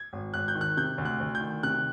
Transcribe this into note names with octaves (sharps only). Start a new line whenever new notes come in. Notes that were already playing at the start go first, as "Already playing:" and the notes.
Already playing: G#6
G#1
G#1 F#6
G6
D#3
F#6
C3 G6
D2
F#6
D2
G6
D#3
C3 F#6